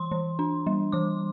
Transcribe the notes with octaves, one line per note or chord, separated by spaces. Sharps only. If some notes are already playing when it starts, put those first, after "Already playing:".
Already playing: E3 C6
E3
D4
G3
E3 D6